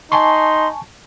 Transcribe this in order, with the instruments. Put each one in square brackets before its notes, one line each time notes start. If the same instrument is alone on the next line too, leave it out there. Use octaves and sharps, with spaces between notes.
[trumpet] D#4 [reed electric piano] G#5 A5 C#6 [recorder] C6